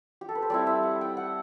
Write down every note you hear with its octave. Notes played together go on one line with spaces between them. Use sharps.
G4
A4
B4
C5
G3 C4 E4 D5
E5
F#5
G5
F#5